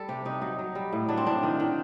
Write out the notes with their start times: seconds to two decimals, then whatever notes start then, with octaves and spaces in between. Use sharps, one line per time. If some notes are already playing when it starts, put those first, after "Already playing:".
Already playing: G3 A4
0.08 C3 G4
0.25 C3 D#4
0.41 F#3 D#4
0.59 F#3
0.75 G3
0.92 A2
1.09 F#3 D4
1.17 C4
1.26 A2 D4
1.43 D#3
1.60 D#3